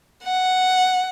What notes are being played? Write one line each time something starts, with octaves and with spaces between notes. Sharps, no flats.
F#5